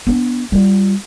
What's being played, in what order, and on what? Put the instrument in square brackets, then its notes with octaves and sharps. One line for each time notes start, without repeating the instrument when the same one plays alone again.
[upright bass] B3 D4
G3 F4